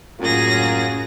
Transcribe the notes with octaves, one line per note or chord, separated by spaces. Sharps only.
F#2 A2 F#3 A#3 F4 G#4 A#6